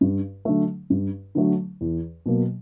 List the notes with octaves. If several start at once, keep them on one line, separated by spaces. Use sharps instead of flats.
G2
D3 F#3 A3
G2
D3 F#3 A3
E2
B2 F#3 A#3